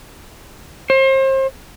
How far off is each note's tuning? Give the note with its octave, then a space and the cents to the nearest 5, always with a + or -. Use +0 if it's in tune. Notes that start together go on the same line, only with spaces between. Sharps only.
C5 +35